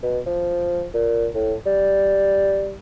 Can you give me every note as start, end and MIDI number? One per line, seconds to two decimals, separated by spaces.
0.03 0.19 47
0.26 0.85 53
0.94 1.27 46
1.34 1.54 45
1.66 2.75 55